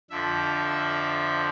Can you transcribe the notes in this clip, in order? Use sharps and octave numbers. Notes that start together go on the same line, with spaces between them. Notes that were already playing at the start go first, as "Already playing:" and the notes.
F2 D3 F3 E5